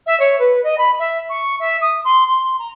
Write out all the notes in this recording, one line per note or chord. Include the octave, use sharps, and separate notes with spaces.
E5
C#5
B4
D#5
B5
E5
C#6
E5
D#6
C6
C6
A#5